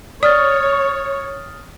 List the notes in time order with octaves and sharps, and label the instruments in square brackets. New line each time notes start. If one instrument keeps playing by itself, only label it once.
[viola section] C#5 [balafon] D5 [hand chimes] D#6 F6 A6